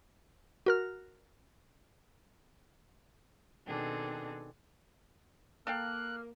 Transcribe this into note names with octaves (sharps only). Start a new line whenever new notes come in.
F#4 A#4 F6
B2 D#3 C4 D4 G#4 A4
A#3 A4 F5 G5 F6 F#6